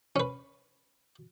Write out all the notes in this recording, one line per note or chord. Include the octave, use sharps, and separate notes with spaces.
C#4 B4